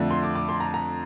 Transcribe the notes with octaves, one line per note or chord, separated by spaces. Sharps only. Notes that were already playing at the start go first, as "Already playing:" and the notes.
Already playing: F2 D3 A3
C6
D6
D6
C6
A#5
A#5